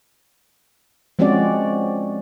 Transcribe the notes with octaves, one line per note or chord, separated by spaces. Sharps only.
F3 G#3 C4 C#4 F#4 D5